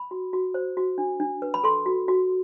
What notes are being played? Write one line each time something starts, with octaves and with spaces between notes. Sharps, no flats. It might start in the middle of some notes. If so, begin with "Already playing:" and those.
Already playing: B5
F#4
F#4
C5
F#4
D4
D4
B4
B5
A4 C6
F#4
F#4